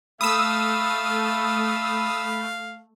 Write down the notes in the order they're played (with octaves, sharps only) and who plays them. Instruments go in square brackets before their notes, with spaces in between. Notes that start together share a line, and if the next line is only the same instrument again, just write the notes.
[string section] A3 [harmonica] F5 [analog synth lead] B5 [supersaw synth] D#6 E6